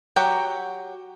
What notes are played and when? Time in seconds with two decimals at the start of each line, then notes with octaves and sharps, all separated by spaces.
0.16 F#3 F#4 G4 F#5 G5